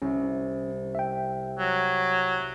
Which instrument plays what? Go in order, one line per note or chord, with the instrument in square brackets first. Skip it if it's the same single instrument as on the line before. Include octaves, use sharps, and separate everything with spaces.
[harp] C2 [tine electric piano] C#4
[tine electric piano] E5 G5
[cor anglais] F#3